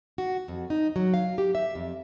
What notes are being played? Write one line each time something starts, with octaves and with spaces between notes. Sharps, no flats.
F#4
F2
D#4
F#3
F5
G4
E5
F2